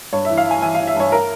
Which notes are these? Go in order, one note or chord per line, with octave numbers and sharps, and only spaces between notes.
G2 C#5
E3 E5
F5
E3 G#5
E3 G#5
E3 F5
E5
G2 C#5
A#4